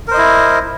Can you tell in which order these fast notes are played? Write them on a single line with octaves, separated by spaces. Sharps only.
A#4 C5 D#5 E4